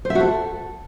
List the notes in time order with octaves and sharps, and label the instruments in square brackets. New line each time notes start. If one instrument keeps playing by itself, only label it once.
[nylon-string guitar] C5
E5
F#4
A4